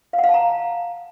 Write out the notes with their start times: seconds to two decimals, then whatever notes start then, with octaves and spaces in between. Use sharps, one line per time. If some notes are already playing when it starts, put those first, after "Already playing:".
0.13 F5
0.18 F#5
0.24 F5
0.29 A5
0.34 A#5